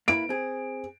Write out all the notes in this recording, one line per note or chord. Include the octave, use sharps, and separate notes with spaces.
A#3 E4 B4 D7
C4 G#4